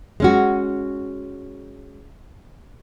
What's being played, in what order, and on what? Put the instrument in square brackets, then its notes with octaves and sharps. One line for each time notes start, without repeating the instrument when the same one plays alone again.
[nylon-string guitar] G#3 C#4 F#4